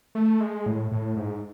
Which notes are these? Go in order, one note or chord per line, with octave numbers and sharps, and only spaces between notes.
A3
G#3
A2
A2
G#2